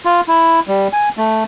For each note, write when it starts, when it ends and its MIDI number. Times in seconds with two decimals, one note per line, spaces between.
0.05 0.21 65
0.28 0.60 64
0.68 0.88 55
0.93 1.09 80
1.17 1.44 57